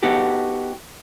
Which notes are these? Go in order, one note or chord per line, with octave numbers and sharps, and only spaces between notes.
B3 D#4 F#4 G4 A4